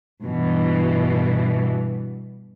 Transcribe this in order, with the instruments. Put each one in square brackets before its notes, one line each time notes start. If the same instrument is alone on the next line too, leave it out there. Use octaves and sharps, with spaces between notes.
[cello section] G2 B2 E3